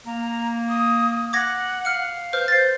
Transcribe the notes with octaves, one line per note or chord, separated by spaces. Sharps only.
A#3 A#5
D#6
F#5 D6 G#6 A#6
F5 F6 C#7
B4 C5 F6 G6
C5 A6 C7